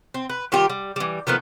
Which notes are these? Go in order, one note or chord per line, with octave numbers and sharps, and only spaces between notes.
C4
B4
D#3 G3 F4 G4
G3
E3 G3
D#3 F3 A3 B3